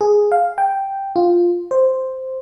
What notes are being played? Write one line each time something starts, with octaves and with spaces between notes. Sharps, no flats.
G#4
F5
G5
F4
C5